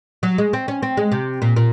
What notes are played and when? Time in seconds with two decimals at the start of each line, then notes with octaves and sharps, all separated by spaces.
0.23 F#3
0.38 G#3
0.53 C4
0.68 C#4
0.83 C4
0.97 G#3
1.12 C3
1.42 A#2
1.56 A#2